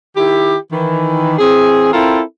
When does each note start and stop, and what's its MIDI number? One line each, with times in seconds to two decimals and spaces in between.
0.16 0.56 51
0.16 0.56 64
0.16 0.56 67
0.72 1.34 51
0.72 1.34 52
1.39 1.91 52
1.39 1.91 60
1.39 1.91 68
1.93 2.21 60
1.93 2.21 64
1.93 2.21 65
1.93 2.21 69
1.93 2.21 70